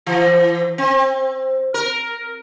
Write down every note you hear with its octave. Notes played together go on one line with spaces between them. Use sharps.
E3
C4
A#4